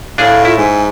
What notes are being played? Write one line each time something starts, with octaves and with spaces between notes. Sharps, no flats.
A2 D4 G#4 F5
E4 F4
G#2 G#5